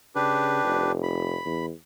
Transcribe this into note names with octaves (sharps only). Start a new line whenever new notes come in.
C#3 D4 G4 B4
F1
B5
E2